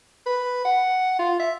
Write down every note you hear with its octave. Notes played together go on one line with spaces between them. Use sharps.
B4
F#5
F4
E5